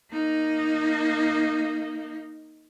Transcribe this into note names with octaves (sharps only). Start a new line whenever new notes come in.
A#3 D#4